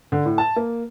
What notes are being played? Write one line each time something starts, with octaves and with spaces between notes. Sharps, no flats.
D3
A2
A5
A#3